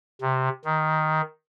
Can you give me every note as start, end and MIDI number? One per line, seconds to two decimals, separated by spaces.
0.22 0.49 48
0.65 1.21 51